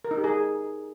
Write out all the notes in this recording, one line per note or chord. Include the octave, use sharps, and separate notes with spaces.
A#4
D#4
G4
G#4